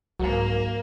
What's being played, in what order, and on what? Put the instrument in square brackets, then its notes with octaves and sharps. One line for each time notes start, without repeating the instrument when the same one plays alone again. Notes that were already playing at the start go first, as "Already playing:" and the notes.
[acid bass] C2 [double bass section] G#2 [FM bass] F#3 [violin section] A#3